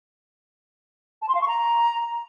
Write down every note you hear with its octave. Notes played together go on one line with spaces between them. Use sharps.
A5
C6
F5
C#6
A#5